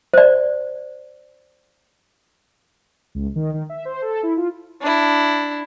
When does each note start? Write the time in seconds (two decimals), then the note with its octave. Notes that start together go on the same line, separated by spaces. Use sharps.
0.14 C5 D5
3.15 C#2
3.35 D#3
3.54 D#3
3.69 E5
3.85 C5
4.02 A4
4.23 E4
4.37 F4
4.82 D4 E4